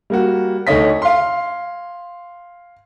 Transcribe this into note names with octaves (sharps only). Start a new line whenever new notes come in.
G3 A#3 F#4
D2 A3 D#4 C#5 D#5 B6
F5 C6